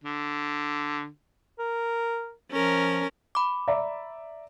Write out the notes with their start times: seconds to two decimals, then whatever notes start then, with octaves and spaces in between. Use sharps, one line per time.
0.04 D3
1.59 A#4
2.52 F3 C#4 A#4
3.35 B5 D6
3.68 D5 E5 A#5